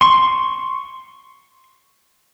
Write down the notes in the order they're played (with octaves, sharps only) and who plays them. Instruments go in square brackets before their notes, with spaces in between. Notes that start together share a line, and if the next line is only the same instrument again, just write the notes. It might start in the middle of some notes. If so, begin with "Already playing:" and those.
[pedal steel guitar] C6 C#6